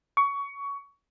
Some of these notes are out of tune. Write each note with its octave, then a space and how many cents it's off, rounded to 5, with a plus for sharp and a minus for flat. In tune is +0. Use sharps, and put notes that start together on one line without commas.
C#6 +20